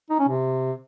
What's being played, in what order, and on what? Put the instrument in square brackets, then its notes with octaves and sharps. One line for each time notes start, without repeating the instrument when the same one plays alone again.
[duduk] D#4
C#4
C3